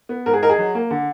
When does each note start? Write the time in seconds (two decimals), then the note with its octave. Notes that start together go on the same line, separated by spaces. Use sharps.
0.09 B3
0.26 G#2 A#4
0.34 G#4
0.42 D#4 A#4
0.50 G#4
0.58 F#3
0.75 A#3
0.91 D3